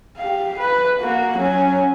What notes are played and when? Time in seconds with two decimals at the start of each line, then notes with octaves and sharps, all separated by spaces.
0.17 G4 F5
0.59 B4
1.00 A#3 F#4
1.38 F#3 C#4